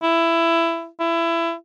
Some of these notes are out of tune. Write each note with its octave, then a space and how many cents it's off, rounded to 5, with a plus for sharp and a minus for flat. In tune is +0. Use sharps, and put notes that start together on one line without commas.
E4 +15
E4 +25